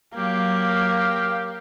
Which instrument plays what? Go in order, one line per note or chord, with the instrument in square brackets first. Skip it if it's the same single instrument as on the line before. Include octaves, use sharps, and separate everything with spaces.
[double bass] F#3 [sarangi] A#3 [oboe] G4 [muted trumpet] F5